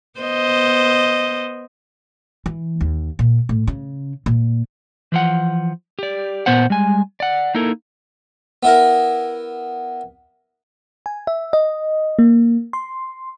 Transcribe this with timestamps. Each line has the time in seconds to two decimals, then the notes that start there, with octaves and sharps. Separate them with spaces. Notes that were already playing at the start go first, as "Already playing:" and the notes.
0.20 B3 C5 D#5
2.46 E3
2.81 D#2
3.19 A#2
3.49 A2
3.67 C#3
4.26 A#2
5.12 E3 F3 F#5
5.99 G4 D5
6.46 A#2 B3 C5 F#5
6.70 G3 G#3 G#5
7.20 D5 F#5
7.55 A#3 D#4 E4 A4 A#4
8.63 B3 E4 A#4
11.06 G#5
11.27 E5
11.53 D#5
12.19 A#3
12.73 C6